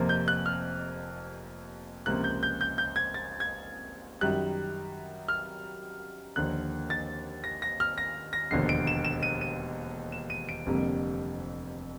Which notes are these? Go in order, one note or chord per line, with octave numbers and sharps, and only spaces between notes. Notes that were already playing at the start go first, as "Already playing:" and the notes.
Already playing: F1 F2 C3 F3 A#3
G6
F#6
F6
C#2 C3 F3 A#3 F#6
G6
G6
G6
G6
G#6
A6
G#6
F#2 D#3 G3 F#6
F6
D#2 D3 F3 A#3 F#6
A6
A#6
A#6
F6
A#6
A#6
E1 D#2 D3 F3 C7
D7
E7
E7
D#7
D#7
E7
D#7
D7
F1 F2 D3 G3 A#3